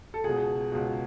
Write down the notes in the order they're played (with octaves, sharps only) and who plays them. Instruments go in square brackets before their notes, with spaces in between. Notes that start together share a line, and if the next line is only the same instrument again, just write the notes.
[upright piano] A4
C#2 B2 G#4
C#2 B2